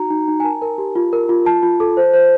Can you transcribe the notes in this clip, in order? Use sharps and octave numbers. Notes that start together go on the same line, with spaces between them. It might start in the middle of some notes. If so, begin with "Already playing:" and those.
Already playing: D#4 F#4 A#5
D#4
D#4
G#5
A#4 A5
A#4
G4
F4
A#4
F4
F4 A5
F4
A4
C5
C5